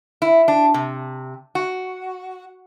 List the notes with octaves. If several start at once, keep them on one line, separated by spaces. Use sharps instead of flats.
E4
D4
C3
F#4